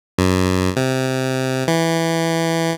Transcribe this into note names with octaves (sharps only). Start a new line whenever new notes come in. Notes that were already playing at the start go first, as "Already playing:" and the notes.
F#2
C3
E3